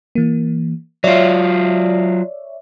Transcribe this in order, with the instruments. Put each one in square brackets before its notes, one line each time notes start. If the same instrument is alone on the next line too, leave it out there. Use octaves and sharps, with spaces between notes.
[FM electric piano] E3 A#3
[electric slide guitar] F#3 F4 [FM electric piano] C#5 D5 E5